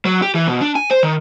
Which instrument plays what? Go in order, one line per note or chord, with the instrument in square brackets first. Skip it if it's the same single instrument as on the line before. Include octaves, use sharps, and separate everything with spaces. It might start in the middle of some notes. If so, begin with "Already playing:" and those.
[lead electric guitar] F#3
G4
E3
B2
D4
G#5
C5
D#3